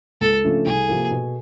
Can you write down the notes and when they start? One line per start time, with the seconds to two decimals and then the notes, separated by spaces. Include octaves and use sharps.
0.21 C#2 A4
0.44 C#3 F3 A3 D4
0.65 C2 G#4
0.88 C3 F3 A#3
1.11 B2